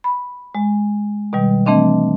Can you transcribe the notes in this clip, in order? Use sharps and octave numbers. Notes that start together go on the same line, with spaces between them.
B5
G#3
B2 D#3 G3
E3 A3 C4 D4 D#5